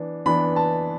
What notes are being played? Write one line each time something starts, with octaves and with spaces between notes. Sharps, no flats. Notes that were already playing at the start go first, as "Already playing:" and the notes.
Already playing: E3 B3 D4
E3 B3 D4 B5
A5